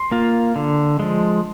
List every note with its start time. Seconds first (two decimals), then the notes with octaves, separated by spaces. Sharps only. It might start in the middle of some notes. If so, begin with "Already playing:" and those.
Already playing: C6
0.11 A#3 F4
0.56 D3
1.00 F3 G#3